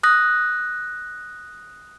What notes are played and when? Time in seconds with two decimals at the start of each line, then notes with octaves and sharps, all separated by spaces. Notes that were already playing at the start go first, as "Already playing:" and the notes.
0.03 D#6 F#6 A#6